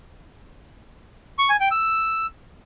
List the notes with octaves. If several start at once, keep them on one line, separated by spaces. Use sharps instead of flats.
C#6
G#5
G5
E6